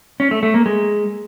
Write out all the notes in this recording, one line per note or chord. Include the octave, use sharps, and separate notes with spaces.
C#4
A3
A3
A#3
G#3